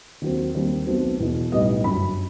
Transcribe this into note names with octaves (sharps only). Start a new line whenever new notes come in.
D#2 D#3 F#3 C4
D#2 D#3 G3 C4
B1 B2 F#3 A3 C4
E1 E2 B2
B1 A2 G3 B3 D#5
G1 F#2 F#3 B5